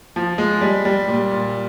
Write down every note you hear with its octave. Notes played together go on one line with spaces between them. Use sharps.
F3
G#3
G3
G3
A#2
A#2